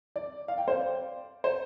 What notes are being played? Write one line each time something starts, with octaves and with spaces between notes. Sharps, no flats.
D5
F5
G5
C5 F5
D5
C5